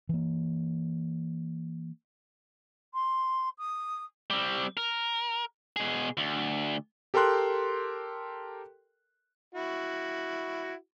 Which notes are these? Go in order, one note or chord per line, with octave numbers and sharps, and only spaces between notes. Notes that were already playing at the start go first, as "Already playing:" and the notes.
E3 A#3
C6
D#6
G3 C4
A#4
B2 G#4
D2
G4 A4 A#4 G5 C6 F#6
E4 F#4